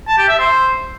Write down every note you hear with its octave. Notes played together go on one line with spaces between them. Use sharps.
A5
G4
E5
C5